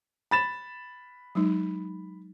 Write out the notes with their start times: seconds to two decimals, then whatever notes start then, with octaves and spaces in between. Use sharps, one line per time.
0.31 B5 A6 E7
1.35 F#3 G#3 D#4